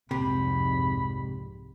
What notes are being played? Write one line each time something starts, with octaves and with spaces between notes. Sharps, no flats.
C2 F2 G#2 C3 B5